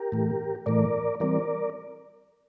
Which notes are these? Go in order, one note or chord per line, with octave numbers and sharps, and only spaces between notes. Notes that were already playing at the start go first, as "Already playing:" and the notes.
Already playing: G4 A#4
A2 E3 A3
A2 E3 A3 A#4 D5
E3 G3 C4 A#4 D5